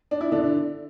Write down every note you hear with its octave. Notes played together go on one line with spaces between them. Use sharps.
D4
E4
D3 D4